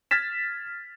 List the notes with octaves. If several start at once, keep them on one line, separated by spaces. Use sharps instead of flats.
F6 G#6 A6 B6 E7